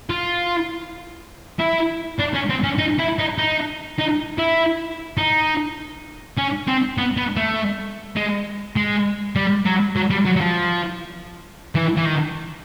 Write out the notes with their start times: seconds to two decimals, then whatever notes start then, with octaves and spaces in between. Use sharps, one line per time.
0.10 F4
1.60 E4
2.19 D4
2.34 C#4
2.49 C4
2.64 C#4
2.78 D#4
2.99 E4
3.19 D#4
3.38 D#4
3.98 D#4
4.38 E4
5.18 D#4
6.37 C#4
6.67 C4
6.98 B3
7.17 B3
7.36 A3
8.16 G#3
8.76 G#3
9.36 G3
9.66 F#3
9.96 F#3
10.10 G3
10.25 F#3
10.36 F#3
10.41 F3
11.75 E3
11.97 E3
12.05 D#3